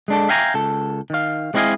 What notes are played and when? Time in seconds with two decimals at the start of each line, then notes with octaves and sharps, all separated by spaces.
0.08 G#3 D4 A4
0.29 E5 F5 G5 G#5 A#5
0.54 C#2 A4
1.10 D#3 F5
1.54 G#3 C4 E4 D#5 F5 G#5